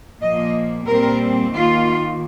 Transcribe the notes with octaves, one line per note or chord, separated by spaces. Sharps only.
A#2 F3 A#3 D#5
A#2 G3 C4 A#4
D#2 D#3 A#3 F4